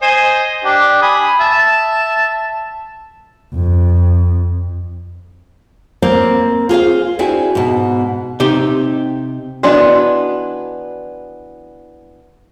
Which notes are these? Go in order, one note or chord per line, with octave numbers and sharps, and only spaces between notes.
C5 D#5 G#5
D4 G4
G#5 B5 D#6
E5 A5
F2
A#3 C4 C5 F5
F4 G#4 C5 F5
C4 D4 E4 F#4 G#4
G#2 B2
C3 D#4 G4
E3 B3 D4 F#4 D5 D#5